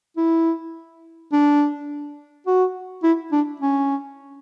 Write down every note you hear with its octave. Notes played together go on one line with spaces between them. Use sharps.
E4
D4
F#4
E4
D4
C#4